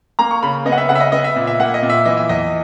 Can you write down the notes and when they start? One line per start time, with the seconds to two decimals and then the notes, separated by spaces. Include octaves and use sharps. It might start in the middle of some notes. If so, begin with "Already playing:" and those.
0.19 A#3 A#5
0.31 C#6
0.42 C#3 B5
0.66 B3 D#5
0.72 F#5
0.78 E5
0.89 C#3 F#5
0.95 E5
1.00 D#5
1.12 B3 D#5
1.24 E5
1.36 A#2
1.47 E5
1.59 A#3 F#5
1.74 D#5
1.82 A#2
1.90 E5
2.05 E3 D#5
2.17 E5
2.29 E2 D#5